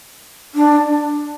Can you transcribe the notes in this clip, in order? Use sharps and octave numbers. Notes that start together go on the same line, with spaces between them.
D4